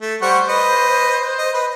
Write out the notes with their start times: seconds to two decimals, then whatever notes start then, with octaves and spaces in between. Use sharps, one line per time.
0.01 A3
0.22 G3 C5 F#5 C#6
0.48 B4 D#5
1.38 D#5
1.53 B4 D#5